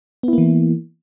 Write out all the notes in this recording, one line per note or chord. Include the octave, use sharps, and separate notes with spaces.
E3 A#3 B3 E4